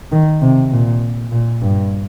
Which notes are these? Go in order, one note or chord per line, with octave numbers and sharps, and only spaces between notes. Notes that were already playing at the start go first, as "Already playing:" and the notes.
D#3
C3
A#2
A#2
G2